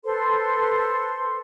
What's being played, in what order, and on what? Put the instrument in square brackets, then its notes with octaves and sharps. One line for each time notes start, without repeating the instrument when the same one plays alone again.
[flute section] A4 B4 C5 C6